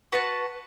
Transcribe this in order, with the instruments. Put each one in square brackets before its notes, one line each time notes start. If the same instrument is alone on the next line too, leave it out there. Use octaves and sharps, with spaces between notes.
[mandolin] F#4 B4 F#5 A5